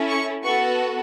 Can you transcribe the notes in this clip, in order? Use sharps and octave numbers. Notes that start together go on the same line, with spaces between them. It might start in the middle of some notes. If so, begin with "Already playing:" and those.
Already playing: C#4 E4 A4
C#6
B3 F#4 A4 C#6